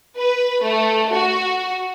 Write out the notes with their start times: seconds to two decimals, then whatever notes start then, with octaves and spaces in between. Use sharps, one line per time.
0.18 B4
0.64 A3
1.13 F#4